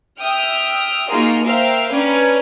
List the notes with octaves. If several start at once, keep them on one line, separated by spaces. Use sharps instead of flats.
E5 G5 D#6 F6
A#3 D#4 F4 F#4 G#4 A#4
A#4 C5 E5 F5 G5
C#4 D4 A#4 B4